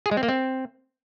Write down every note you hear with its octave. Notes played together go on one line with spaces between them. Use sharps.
G#4
G#3
C4
A#3
C4